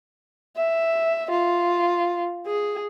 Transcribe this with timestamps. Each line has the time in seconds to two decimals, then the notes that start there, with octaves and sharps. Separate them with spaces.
0.57 E5
1.31 F4
2.47 G#4